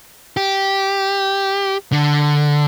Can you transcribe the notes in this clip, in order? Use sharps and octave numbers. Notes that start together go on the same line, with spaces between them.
G4
D3